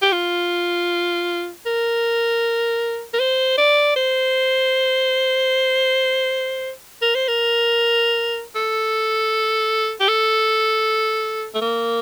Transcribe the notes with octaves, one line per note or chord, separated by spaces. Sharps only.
G4
F4
A#4
A#4
C5
D5
C5
A#4
C5
A#4
A4
G4
A4
A3
A#3